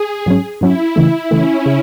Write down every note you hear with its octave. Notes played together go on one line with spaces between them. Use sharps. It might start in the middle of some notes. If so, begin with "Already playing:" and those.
Already playing: G#4
G#2 F#3 C#4
G#2 F#3 C#4 E4
C#3 E3 A3 E4
C#3 E3 A3 C#4
C#3